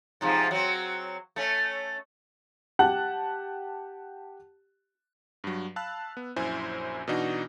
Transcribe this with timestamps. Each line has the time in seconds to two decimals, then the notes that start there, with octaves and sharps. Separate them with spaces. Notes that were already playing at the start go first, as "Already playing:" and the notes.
0.21 G#2 C3 F3
0.51 F#3 C4
1.36 A3 C#4
2.79 G4 F#5 A5 F#6
5.44 G2 F#3
5.76 F5 A5 B5 E6 F#6
6.17 B3
6.36 A#1 F#2 E4 C5 G#5
7.07 B2 E3 D4 D#4 F#4